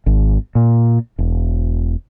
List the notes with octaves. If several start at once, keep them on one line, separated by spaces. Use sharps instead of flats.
G#1
A#2
E1